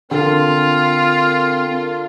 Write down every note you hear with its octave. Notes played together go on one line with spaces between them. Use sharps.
D3 C4 F4 A#4